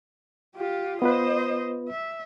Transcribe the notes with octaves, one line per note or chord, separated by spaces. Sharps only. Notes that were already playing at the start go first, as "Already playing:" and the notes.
F4 G4
B3 F4 B4 C5 D#5
E5